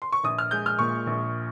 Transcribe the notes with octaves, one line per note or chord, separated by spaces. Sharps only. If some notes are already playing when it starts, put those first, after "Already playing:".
C6
C#6
A#1 D#6
F6
G#3 G6
F6
A#2 C#6
A#1